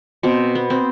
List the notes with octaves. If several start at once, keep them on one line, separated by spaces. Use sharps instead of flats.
B2 C4
B3
C4